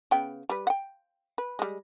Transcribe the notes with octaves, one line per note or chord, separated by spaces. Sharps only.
C#3 B3 G5
G3 B4
F#5 G5
B4
G3 G#3